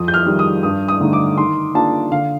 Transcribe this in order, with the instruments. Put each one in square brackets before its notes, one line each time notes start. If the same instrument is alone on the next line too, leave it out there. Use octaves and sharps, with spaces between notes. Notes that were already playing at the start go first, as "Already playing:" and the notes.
Already playing: [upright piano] F2 D#6
G6
F6
D#3 G3
D#6
G2 D#6
D#6
D3 A3 D#4
D6
D#3 C6
A#3 D4 F4 A5
D3 F5